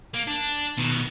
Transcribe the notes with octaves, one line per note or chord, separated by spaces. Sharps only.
A#3
D4
B2 D#3